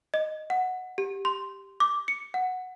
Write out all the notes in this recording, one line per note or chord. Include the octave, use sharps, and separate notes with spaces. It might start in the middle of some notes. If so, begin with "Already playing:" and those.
D#5
F#5
G4
C6
D6
C#7
F#5